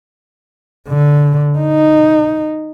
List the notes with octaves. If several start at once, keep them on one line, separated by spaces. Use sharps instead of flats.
D3
D#4